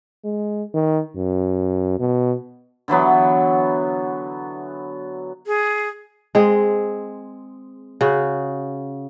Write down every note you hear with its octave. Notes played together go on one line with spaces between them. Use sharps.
G#3
D#3
F#2
B2
D3 E3 F#3 B3
G#4
G#3 C4 G#4
C#3 F#4